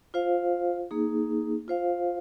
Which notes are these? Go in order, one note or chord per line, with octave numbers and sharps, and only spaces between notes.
F4 C5 F5
A#3 D#4 G#4
F4 C5 F5